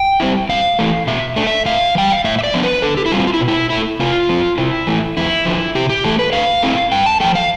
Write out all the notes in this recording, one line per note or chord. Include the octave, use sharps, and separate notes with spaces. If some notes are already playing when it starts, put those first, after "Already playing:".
Already playing: G5
G3 C4 E4
G2 F5
E3 A3
B2 E5
A3 D4
E5
A2 F5
E3
G3 G5
F5
A2 E5
E5
D5
F3 B3 D4
B4
D3 A4
G4
E4
G3 C4 F4
F4
E4
B2
E4
A3 E4
C3 F4
F3 C4
C3 E4
E3 A3 E4
F2 E4
D3 F3
C3 G4
G4
E3 A3 A4
B4
D3 F5
A3 C4 E4
G2 G5
A5
F3 A3 G5
F5